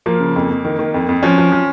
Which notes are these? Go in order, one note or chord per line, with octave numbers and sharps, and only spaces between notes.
F3 A#3
C#3
F2
F2
D#3
D#3
F2
F2
F3 C#4
F3
F3